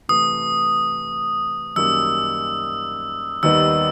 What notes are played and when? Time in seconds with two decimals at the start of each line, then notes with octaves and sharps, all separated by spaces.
0.09 C3 E3 A3 D#6
1.76 F#2 D#3 G3 A#3 C#4 E6
3.43 D#2 D#3 G3 B3 D#4 E6